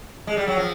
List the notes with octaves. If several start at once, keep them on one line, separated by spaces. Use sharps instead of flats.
G#3
G3
F#3
F3